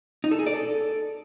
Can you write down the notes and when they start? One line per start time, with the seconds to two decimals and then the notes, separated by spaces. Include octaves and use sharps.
0.24 D#4
0.31 A4
0.39 G#4
0.47 D5
0.54 A4